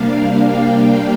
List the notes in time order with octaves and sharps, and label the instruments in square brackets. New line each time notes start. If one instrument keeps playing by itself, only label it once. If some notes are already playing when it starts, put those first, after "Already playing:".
Already playing: [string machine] C3 G3 A#3 D4 F5
G5